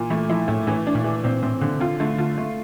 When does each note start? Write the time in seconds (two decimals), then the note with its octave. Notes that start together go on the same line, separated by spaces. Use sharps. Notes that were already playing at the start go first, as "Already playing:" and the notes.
Already playing: A#2 E3
0.10 E3 A3
0.29 F3 E4
0.48 A2 A3
0.67 A2 E3
0.87 D4
0.95 A#2
1.04 E3
1.24 A#2 C4
1.42 A2 C4
1.61 A#2 D3
1.80 C3 F4
2.00 D3 A3
2.18 D3 F4
2.38 A3